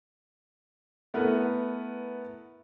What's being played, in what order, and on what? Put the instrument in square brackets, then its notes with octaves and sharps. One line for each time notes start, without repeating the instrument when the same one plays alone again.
[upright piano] A3 B3 E4 A#4 B4